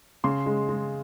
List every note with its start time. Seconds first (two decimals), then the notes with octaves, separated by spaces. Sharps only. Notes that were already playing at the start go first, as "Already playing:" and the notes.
0.24 C#3 C6
0.46 G#3
0.69 G#3